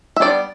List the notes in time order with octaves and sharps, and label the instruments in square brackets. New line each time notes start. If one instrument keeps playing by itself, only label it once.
[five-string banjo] E5
G3 B3 D4 D5